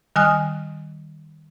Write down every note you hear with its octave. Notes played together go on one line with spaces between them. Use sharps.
D#3 G3 G#5 D#6 F6 F#6